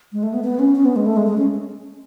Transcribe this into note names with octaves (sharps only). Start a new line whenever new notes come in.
G#3
A3
B3
B3
C#4
C#4
B3
G#3
A3
G#3
G#3
C#4